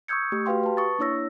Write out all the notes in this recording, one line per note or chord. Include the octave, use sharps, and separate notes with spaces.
C#6 D#6 E6 G6 G#6 C#7
A3 G4
F#4 G4 B4 F5 G5 C6
B4 A5
C#6 D#6 A6
A#3 D4 E4 C#5 E6 A#6